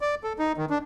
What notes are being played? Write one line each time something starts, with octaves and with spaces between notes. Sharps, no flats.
D5
A4
D#4
D#3
D4